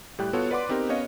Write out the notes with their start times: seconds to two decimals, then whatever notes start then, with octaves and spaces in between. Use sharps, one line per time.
0.19 A2 G3 G4 G5 F#6
0.33 B3 F4 F#4 A4 C#5
0.51 B4 D5 F#5 C6 D6
0.69 B3 C4 D#4 G4 A#4
0.89 B3 C#4 C#5 D#5 F5